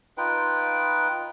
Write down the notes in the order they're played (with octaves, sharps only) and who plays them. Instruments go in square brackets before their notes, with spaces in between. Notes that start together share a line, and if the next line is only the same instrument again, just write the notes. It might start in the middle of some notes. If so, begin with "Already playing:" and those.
[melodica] D#4 F4 B4 G5